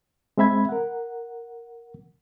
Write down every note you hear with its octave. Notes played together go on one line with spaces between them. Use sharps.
G#3 C4 E5 B5 G#6
A#4 F#5